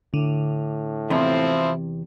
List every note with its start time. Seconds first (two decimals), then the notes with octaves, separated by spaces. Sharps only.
0.14 A2 D3
1.10 E2 C3 F3 C4 E4